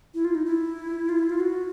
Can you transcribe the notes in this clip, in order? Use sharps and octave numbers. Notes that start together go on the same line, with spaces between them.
E4
F4
D#4
E4
F4
E4
F4
F#4